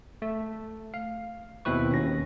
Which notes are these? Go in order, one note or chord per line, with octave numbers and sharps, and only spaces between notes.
A3
F5
D#2 B2 C4 E4 B4 C#6
D#2 C#4 A#6